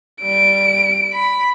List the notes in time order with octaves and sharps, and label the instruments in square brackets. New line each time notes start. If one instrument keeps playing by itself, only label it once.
[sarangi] G3 [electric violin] D7
[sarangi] B5